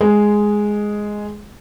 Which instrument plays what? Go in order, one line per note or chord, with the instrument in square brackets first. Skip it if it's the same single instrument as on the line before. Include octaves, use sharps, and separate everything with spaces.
[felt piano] G#3 G#4